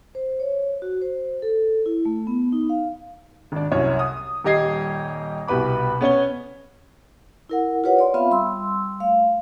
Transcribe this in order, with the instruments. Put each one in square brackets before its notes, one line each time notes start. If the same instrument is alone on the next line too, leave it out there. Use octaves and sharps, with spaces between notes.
[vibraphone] C5
C#5
F#4
C5
A4
E4
A3
B3
D#4
F5
[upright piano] G#1 D4
C2 F#2 C#5
D#6
D#1 G3 G4 D#5 G#6 C7
C2 B2 G4 B4 B5 D6
B3 C#4 C#5 G7
[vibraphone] E4 A#4 F#5
F4 G4 B4 C#5 F#5
C#5 D5 C6
B3 C4 F4 E5 F5 B5
G3 C6 E6
A3 F5